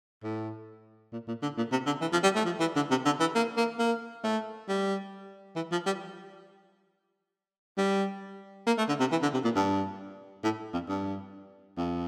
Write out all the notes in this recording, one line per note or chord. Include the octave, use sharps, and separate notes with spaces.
A2
A#2
A#2
D3
A#2
C3
D3
E3
F3
G3
A3
F3
E3
D3
C3
D3
E3
A#3
A#3
A#3
A3
G3
E3
F3
G3
G3
A#3
A3
D3
C3
E3
D3
C3
A#2
G2
A2
F2
G2
F2